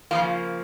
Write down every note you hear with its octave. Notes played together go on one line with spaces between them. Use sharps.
C#3 F3 A#3 F4